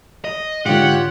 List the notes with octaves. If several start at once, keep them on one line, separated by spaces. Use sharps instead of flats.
D#5
G#2 D3 F4 G4 C#5 F#5